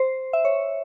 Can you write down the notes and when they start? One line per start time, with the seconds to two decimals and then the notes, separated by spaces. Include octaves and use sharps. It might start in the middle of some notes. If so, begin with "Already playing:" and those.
Already playing: C5
0.33 E5
0.45 C#5